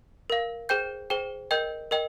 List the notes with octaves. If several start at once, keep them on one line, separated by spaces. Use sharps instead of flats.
A#4 F5
G#4 C5 G5 G6
G#4 C5 G5
A#4 D#5 G5 G6
A#4 D#5 G5